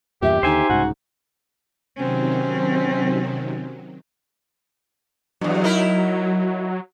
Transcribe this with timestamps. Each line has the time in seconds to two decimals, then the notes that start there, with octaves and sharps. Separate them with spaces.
0.23 E2 G2 A#2 G4 E5
0.43 D#2 D3 D#4 C5 E5 G#5
0.69 C2 G#2 C#3 F#4
1.97 C3 D#3 F#3 C4 C#4
5.41 E2 G2 F#3
5.64 D#4 E4 A#4